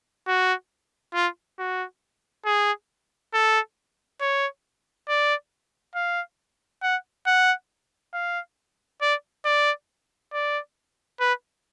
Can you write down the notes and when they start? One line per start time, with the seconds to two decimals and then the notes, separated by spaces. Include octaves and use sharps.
0.27 F#4
1.14 F4
1.59 F#4
2.46 G#4
3.33 A4
4.21 C#5
5.08 D5
5.95 F5
6.83 F#5
7.27 F#5
8.14 F5
9.01 D5
9.45 D5
10.33 D5
11.20 B4